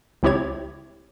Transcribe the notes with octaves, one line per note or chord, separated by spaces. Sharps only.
C#2 C4 E4 G4 C#5 G#6